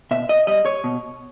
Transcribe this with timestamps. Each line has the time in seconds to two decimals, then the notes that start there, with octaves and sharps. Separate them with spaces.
0.11 B2 E5
0.29 D#5
0.47 G3 D#5
0.65 C#5
0.84 B2